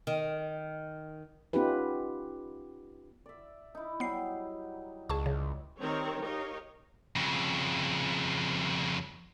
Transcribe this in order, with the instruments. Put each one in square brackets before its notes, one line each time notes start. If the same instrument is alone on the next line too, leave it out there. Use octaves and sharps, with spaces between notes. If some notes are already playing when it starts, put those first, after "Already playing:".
[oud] D#3
[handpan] B3 C#4 D#4 F4 G4 B4
[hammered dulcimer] D5 E5
D#4 E4
[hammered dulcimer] F#3 G3 [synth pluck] B3 C7
[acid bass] C#2 [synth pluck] G#4 A5 C#6
[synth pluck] C#3
[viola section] D#3 G3 C4 A#4 C#5
D#4 G4 A#4 C#5 D#5 F5
[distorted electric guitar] F2 C#3